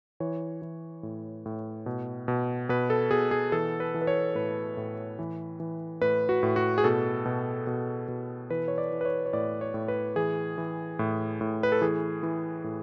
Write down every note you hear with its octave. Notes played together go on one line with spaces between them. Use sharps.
E3 C#5
E3
A2
A2
B2
B2
B2 B4
A4
B2 G#4
G#4
E3 A4
B4
E3
B4
C#5
A2 B4
A2
E3
E3
A2 B4
F#4
A2
F#4
G#4
B2 A4
B2
B2
B2
E3 B4
C#5
D5
E3
B4
C#5
C#5
A2 D5
C#5
A2
B4
E3 G#4
E3
A2
A2
B4
A4
E3 G#4
E3
A2